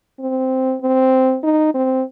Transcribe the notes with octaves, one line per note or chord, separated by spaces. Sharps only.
C4
C4
D#4
C4